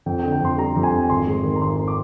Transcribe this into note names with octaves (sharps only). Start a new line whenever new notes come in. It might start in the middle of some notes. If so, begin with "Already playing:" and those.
F2 G5
G5
D3
G5
F2 C6
G3 A#5
F2
G#5
F2
G#1 C6
G#3
D#3
A#5
G#1 C6
D6